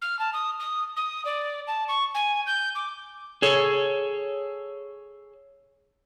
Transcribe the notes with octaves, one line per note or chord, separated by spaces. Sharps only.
F6
A5
D#6
D#6
D#6
D5
A5
C#6
G#5
G6
D6
G#4 A4 C#5